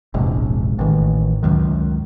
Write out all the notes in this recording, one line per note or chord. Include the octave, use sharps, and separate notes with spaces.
E1 A#1 G#2 C3
A1 D#3
C#2 F#2 D#3